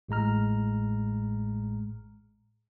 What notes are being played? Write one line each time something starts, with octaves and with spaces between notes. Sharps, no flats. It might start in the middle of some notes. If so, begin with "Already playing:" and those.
A1 A2 G#3 A#5 F6